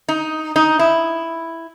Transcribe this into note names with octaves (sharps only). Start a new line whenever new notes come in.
D#4
D#4
E4